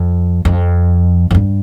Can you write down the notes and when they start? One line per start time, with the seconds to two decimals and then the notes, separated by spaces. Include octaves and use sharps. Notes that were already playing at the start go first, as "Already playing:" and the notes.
Already playing: F2
0.45 F2
1.31 F2
1.35 G2